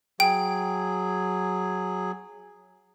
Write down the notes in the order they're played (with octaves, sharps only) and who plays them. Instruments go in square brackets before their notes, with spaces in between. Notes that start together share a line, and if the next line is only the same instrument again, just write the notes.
[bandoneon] F#3 G#4 [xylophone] G5